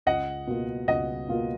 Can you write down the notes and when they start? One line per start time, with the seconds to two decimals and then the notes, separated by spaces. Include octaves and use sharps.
0.06 C#2 D#5 F#5
0.47 B2 A#3 F4
0.88 C#2 D#5 F#5
1.29 B2 A#3 F4